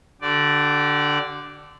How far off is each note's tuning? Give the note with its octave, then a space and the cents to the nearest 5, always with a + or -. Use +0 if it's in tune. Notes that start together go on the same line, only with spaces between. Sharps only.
D3 +0 G4 -45 D5 +0